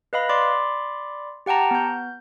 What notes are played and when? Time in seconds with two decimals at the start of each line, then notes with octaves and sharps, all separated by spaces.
0.13 B4 D#5 F5 B5
0.29 D5 B5 C6 D6
1.46 G4 F#5 G5 A5 A#5
1.71 B3 G6